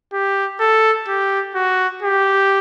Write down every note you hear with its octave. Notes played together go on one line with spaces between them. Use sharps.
G4
A4
G4
F#4
G4